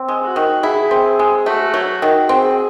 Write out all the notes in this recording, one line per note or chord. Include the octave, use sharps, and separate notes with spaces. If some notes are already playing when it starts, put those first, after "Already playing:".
Already playing: C4
G#3
F#4
D#3
E4 G#4
C4
G#3
A3 F#4
F#3
D#3
C4 G#4